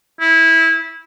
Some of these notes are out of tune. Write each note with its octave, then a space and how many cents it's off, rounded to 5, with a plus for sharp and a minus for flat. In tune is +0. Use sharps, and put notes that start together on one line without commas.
E4 -15